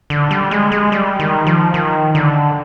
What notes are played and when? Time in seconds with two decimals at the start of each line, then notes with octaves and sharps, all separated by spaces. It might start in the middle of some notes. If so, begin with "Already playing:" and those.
0.10 D3
0.31 G3
0.51 G#3
0.72 G#3
0.92 G3
1.20 D#3
1.47 F3
1.74 D#3
2.15 D3